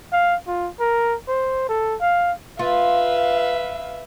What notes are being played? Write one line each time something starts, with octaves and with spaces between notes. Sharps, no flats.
F5
F4
A#4
C5
A4
F5
F4 B4 E5 F5